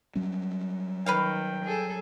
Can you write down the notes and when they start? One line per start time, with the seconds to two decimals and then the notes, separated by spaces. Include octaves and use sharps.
0.15 F#3 G3 C#4
1.06 D#3 B4 C#5 F5 G5
1.64 G#4 A4